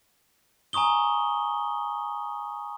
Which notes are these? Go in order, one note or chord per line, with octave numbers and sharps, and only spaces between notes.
G#5 A#5 C#6 D#6 G7